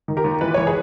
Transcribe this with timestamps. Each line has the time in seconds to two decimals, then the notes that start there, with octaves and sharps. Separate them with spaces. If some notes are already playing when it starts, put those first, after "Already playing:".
0.08 D#3
0.17 G4 A#4
0.24 D#2
0.41 E3 B4
0.54 E3 C#5
0.67 G#4 B4